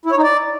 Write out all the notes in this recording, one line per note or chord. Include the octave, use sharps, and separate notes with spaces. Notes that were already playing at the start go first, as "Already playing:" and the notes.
E4
C#5
D#4
D5